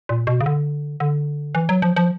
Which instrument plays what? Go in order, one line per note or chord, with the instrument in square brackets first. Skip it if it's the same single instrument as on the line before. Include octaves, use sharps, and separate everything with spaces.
[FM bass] A#2
B2
C#3
D3
D3
E3
F#3
F3
F3